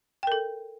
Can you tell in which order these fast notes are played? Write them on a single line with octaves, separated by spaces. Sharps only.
G5 A#4 A4